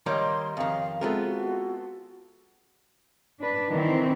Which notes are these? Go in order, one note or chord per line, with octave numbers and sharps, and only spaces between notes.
D#3 G3 A#3 C#5 D#5 C6
F2 D#3 F5
G#3 B3 C4 F4 A4 A#4 E5
F#4
D4 B4
D#3 E3 C4